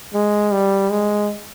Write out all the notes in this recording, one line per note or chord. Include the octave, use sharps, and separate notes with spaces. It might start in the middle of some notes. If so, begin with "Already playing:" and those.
G#3
G3
G#3